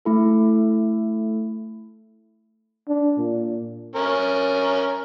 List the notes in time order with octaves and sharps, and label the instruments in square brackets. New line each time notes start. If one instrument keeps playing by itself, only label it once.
[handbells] A3 E4 A4
[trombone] D4
A#2
[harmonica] C#4 A#4